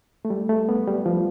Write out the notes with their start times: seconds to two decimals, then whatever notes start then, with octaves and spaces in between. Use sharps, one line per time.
0.25 A3
0.30 G3
0.49 A3
0.69 B3
0.88 G3
1.06 F3